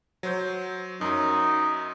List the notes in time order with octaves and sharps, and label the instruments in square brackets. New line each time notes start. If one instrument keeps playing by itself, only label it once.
[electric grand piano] F#3 C5 G6
[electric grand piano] F#2 F#3 [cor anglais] D#4